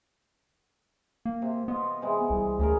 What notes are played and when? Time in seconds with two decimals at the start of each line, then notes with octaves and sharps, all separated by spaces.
1.26 A#3
1.42 C3
1.68 B3 F4 D#5
2.02 C3 E3 G#3
2.30 C2
2.59 D2 C#3 G#4 A#4